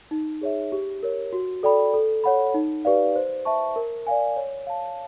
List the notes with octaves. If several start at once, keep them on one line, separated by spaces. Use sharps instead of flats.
D#4
G#4 C#5 E5
G4
A#4 C#5
F#4
A4 D5 G5 B5
A4
C#5 F#5 B5
D#4
G4 B4 D5 F5
C5
E5 A5 C#6
A#4
D5 F5 G#5
C#5
F5 A5